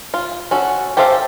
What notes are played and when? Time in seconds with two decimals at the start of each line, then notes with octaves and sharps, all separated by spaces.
0.14 F4
0.51 C#4 F#4 A4
0.97 G4 A4 C5 E5 F5